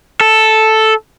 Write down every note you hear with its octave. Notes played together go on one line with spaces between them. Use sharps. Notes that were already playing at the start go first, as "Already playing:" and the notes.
A4